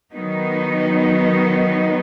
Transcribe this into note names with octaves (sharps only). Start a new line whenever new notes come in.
D#3 F#3 B3 D#4